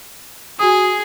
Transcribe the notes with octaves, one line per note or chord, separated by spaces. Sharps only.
F#4 G#4 D#6